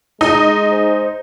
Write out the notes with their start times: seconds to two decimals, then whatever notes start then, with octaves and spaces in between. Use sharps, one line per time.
0.21 G#3 D#4
0.71 C5